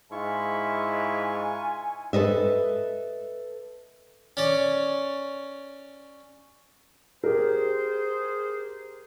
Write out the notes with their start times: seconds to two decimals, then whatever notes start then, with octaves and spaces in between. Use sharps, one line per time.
0.12 G#2 E4 F4 G#5 C#6
2.13 A4 B4 D#5 E5
4.37 C#4 C#5 D5
7.24 G4 G#4 A#4 C5